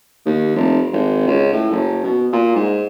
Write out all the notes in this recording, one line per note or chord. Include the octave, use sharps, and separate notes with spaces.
D#2
F1
G#1
C#2
A2
F#1
B2
A#2
G#2